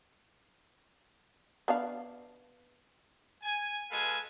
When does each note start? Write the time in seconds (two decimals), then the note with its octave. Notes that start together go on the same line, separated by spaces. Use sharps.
1.68 B3 D4 F5
3.43 G#5
3.91 B2 G#3 A4 B4 F5 G#5